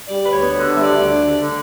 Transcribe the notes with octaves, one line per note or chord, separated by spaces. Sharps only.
G3 D5
D2 B4
C#5
B3
D3
G3 E5
D5
D2
D4
D3
D3